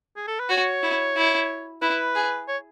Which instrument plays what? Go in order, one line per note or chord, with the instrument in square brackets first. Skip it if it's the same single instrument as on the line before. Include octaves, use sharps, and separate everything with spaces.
[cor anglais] G#4
A4
B4
[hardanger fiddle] F#4 [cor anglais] C#5
[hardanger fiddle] E4
E4
[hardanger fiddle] E4 [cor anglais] B4
[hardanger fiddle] G#4
[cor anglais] C#5